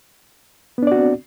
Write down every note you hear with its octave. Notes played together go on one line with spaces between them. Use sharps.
B3 C4 D4 F#4 D5